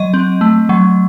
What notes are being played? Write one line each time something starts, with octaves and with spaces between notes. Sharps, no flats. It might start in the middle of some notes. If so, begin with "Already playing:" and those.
Already playing: F#3 D#5
C4
A3
F#3